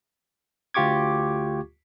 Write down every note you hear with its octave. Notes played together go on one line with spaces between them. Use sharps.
D2 F4 G4 C#6 D6 G#6